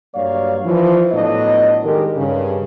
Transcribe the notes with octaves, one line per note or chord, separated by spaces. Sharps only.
G2 F#3 A#3 C#5 D5 F5
E3 F3
A2 F#3 B3 D4 D#5
D#3 G#3 G4 A4 A#4
G2 C#3